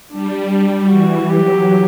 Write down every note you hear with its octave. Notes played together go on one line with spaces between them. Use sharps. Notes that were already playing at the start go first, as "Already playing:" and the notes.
G3 D4
D4
E3 F#4
F#3 G4